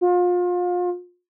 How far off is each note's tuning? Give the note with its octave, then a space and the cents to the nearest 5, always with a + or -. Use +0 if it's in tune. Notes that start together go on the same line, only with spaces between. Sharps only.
F4 +30